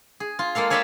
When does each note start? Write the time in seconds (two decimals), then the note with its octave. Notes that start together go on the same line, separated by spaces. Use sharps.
0.20 G#4
0.39 F4
0.55 G#3 A#3 A4 F5
0.70 G#4 C#5 D5 E5 G5 A5